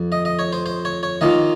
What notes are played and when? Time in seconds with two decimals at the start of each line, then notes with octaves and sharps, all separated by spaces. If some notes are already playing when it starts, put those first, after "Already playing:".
Already playing: F2
0.12 D#5
0.25 D#5
0.39 C#5
0.53 C5
0.66 C5
0.85 C#5
1.03 C#5
1.21 D#3 A#3 F4 D#5